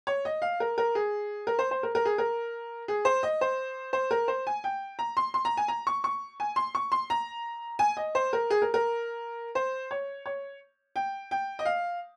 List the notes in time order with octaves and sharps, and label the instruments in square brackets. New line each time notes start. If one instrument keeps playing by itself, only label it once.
[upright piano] C#5
D#5
F5
A#4
A#4
G#4
A#4
C5
C5
A#4
A#4
G#4
A#4
G#4
C5
D#5
C5
C5
A#4
C5
G#5
G5
A#5
C6
C6
A#5
G#5
A#5
C#6
C#6
G#5
C6
C#6
C6
A#5
G#5
D#5
C5
A#4
G#4
A#4
A#4
C5
C#5
C#5
G5
G5
D#5
F5